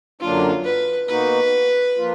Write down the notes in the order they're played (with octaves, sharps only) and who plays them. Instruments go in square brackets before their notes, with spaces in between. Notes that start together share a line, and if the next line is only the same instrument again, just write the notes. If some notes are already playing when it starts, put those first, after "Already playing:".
[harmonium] F#2 D3 F#3 A#3 D4 [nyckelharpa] F4
[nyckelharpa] B4
[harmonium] B2 A#3 D#4 F#4 [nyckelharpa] B4
[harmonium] F3 A#3 F4